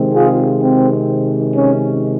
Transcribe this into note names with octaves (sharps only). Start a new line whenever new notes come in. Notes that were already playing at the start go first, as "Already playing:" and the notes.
Already playing: C3 D#3 G#3 C4
F4 G#4
C4
C#4